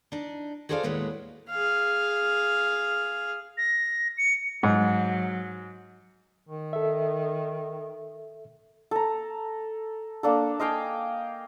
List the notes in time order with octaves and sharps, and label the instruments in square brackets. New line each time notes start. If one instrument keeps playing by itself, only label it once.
[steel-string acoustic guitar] D4 D#4
F#4 G#4 A4 C5 D5 F5
D#2 A2 G#3 B3 B4 C#5
[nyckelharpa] G#4 F5
[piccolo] A#6
C#7
[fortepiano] G#2 [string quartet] F#3
[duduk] D#3
[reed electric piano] A4 E5
[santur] A4 A#5
A#3 D4 A4
D#5 F5 G5 G#5